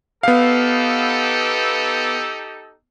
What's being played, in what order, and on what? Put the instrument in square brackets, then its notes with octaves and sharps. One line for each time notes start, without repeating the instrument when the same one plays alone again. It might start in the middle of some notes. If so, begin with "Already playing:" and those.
[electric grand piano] B3 F5 [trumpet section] D#4 G4 A4